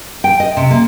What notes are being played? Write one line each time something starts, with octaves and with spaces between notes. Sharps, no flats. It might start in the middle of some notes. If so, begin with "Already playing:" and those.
G5
D#5
C3
A#3